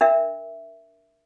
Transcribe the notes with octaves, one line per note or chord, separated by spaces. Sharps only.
D4 A#4 E5